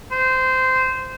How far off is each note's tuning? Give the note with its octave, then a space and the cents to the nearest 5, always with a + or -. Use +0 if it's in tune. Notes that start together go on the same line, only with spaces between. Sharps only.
C5 -15